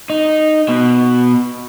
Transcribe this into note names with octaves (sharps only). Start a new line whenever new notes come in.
D#4
B2